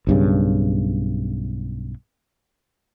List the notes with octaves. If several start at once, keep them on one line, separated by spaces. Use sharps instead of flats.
B1 G2 C#3